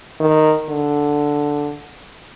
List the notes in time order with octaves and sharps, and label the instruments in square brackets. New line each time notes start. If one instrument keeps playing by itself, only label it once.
[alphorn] D#3
D3